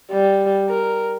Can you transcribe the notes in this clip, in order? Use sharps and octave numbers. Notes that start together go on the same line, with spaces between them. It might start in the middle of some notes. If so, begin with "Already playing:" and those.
G3
A#4